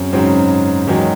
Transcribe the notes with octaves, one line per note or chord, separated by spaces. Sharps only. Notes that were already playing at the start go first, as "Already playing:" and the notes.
Already playing: F#2 C#3 F#3 C4
G#2 C#3 F#3 C4
E2 G#2 D#3 F#3